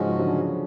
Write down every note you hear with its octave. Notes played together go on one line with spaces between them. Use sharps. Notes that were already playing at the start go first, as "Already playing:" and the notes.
Already playing: G#2 C#3 F3 G#3 C#4 F#4
D3 F#3